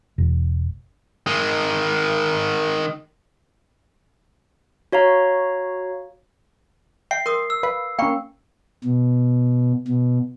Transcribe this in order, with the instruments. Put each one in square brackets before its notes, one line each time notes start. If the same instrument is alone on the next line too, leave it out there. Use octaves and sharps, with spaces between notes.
[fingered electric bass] E1
[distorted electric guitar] D#3 G#3
[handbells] F#4 C#5 F5 A#5
[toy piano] E5 [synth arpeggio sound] G5 [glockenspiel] C7
[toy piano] A#4 D#6 [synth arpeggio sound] C6
[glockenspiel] E6
[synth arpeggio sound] B4 [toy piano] F5
[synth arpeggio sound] A#3 C#4 [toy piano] G5 B5 C#6
[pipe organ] B2
B2